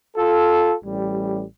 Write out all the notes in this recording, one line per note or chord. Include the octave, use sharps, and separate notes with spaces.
F4 A4
A1 G3